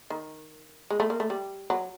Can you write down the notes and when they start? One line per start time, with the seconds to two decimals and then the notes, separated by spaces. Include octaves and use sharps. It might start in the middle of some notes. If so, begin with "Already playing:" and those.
0.10 D#3
0.90 G#3
1.00 A3
1.10 A#3
1.20 A3
1.30 G3
1.70 F#3